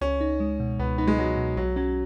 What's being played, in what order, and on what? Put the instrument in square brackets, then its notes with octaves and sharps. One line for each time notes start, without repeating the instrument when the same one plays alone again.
[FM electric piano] C#2 [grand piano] C#4
[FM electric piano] D#4
G#3
B2
[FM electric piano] C#2 [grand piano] B3
[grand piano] B3 [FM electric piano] D#4
[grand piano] G#3
[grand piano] F#3 [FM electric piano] G#3
[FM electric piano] B2
[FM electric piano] B1 [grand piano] F#3
[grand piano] F#3 [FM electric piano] C#4